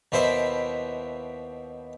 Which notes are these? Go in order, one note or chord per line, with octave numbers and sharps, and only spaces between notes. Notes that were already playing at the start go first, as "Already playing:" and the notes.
D#2 B2 E4 C5 B5